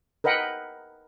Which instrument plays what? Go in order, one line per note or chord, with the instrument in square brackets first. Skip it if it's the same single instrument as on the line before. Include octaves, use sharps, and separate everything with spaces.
[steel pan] A#4 B4 D#5 F#5 G5